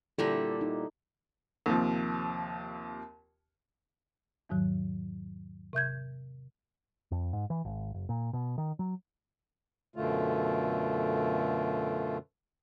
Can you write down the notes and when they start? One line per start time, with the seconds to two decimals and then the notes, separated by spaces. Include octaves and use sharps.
0.18 A#2 D3 G3 E4 A4
0.61 D#4
1.66 D#2 C3 F3
4.49 E2 G#2 D#3 F#3
5.73 C3 E5 G6 G#6
7.11 F2
7.33 G#2
7.50 E3
7.65 G#1
7.94 F#1
8.09 A#2
8.33 B2
8.58 D#3
8.79 F#3
9.96 F#2 B2 D3 A3 F4